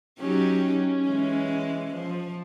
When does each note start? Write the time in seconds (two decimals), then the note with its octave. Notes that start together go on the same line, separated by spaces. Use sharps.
0.20 F#3 C#4 D#4 G4
1.05 E3 G#3
1.93 F3